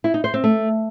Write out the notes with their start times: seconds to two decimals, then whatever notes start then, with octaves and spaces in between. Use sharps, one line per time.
0.04 E4
0.14 D#4
0.24 C5
0.34 C4
0.44 A3